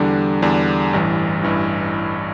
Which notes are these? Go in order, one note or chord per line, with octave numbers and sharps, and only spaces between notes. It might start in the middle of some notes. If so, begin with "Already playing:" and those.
Already playing: E2 D3 G3 D4
E2 D3 G3 D4
A1 G2 E3
A1 G2 E3